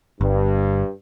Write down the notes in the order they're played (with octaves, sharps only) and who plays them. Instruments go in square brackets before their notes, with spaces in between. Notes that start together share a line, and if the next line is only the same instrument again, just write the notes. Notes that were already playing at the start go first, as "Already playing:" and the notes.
[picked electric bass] G1 [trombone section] G2